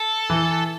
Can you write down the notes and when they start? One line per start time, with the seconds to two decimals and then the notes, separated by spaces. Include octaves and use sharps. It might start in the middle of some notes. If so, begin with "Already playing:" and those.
Already playing: A4
0.30 E3